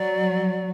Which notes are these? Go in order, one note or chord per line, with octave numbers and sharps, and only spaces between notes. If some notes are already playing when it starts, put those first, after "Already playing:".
Already playing: F#3 D5